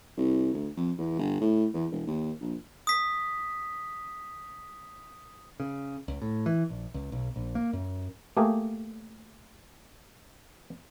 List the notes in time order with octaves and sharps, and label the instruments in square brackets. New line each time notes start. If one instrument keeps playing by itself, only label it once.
[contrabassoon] C2
D2
F2
E2
G1
A2
E2
E1
D#2
A#1
[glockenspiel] D#6 B6
[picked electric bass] C#3
C#2
A2
E3
A#1
C#2
B1
A#1
A#3
F#2
[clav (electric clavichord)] A3 A#3 G4 G#4 A#4